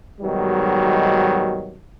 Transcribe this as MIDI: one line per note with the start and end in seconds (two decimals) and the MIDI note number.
0.21 1.77 44
0.21 1.77 47
0.21 1.77 51
0.21 1.77 54
0.21 1.77 55